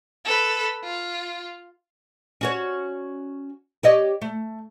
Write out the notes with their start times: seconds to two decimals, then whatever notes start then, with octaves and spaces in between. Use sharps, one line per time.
0.25 A4 B4
0.84 F4
2.41 C#4 F#4 C#5
3.83 G4 C#5 D#5
4.22 A3